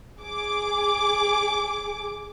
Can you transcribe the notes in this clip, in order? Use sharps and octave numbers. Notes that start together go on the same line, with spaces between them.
G#4 D6